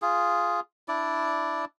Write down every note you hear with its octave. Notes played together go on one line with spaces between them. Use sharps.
F4 G#4
D4 E4 D5